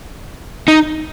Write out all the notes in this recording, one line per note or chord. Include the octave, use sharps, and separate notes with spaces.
D#4